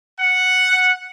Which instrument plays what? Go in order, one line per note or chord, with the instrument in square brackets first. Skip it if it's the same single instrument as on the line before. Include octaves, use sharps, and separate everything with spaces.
[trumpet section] F#5